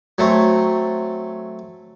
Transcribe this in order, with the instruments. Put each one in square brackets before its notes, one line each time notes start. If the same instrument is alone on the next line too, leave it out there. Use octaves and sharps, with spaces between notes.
[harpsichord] F#3 A3 C4